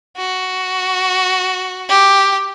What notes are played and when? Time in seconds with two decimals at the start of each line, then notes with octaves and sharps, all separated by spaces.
0.17 F#4
1.89 G4